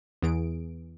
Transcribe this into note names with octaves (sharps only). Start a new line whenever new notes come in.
E2 E3 G#4 D7